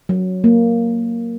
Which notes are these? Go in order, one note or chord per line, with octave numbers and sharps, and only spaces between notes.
F#3
A#3